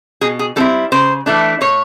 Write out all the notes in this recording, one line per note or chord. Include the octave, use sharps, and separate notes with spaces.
B2 G#4
G#4
G3 C4 E4 A4
C#3 C5
E3 A3 D4
A2 C#5